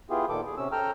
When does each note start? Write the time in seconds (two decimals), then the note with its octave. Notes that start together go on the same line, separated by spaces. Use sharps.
0.10 B3 E4 F4 G4 G#4
0.29 A#2 D#3 A4 D6
0.45 G#4
0.58 C3 C#4 E6
0.72 A4 G5 A#5 E6 F6